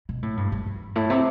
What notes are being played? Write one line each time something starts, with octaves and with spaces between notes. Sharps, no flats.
B2
A2
G2
G2
G2
A2
C3